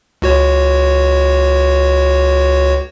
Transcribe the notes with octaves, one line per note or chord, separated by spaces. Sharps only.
C#2 F#4 C#5